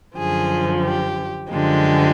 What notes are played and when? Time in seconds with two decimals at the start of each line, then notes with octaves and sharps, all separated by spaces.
0.16 F#2 D3 F3 G#4
0.83 G4
1.50 F#2 D3 F3 G#3 G4